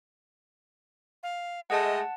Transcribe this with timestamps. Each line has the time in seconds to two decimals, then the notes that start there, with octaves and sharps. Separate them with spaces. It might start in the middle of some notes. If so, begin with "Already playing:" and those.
1.23 F5
1.70 G#3 A3 D#5 F#5 A5